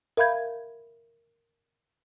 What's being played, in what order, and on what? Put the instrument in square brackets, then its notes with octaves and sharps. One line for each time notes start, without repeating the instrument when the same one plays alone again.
[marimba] A#4 E5 F5 B5 G6 G#6